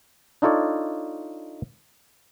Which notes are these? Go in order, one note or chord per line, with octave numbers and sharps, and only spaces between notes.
D4 D#4 F4 A4 C#5 D5